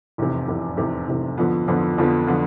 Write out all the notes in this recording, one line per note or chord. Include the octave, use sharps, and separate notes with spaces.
F1 E2 C3
F1 E2 C3
F1 E2 C3
F1 E2 C3
F2 D3 F3 B3
F2 D3 F3 B3
F2 D3 F3 B3
D3 F3 B3